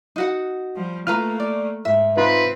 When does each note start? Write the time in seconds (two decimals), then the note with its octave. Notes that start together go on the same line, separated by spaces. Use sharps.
0.16 D#4 F#4 F#5
0.76 F3 G3
1.07 A3 A#3 F4 B4 A#5 F6
1.40 D5
1.85 G#2 E5
2.17 C4 D#4 F4 B4